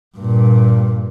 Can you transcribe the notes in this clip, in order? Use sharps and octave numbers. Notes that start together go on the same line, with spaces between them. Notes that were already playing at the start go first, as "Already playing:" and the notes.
G2 A#2